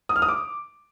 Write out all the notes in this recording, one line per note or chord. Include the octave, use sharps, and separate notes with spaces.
D#6
F6
D#6
D6